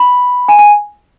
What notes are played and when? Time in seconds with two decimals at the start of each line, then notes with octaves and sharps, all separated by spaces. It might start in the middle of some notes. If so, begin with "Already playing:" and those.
Already playing: B5
0.48 G#5
0.59 G#5